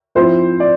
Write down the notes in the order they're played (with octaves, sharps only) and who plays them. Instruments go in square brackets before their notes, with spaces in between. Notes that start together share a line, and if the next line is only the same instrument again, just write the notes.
[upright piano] F3 C4 E4 C5
D5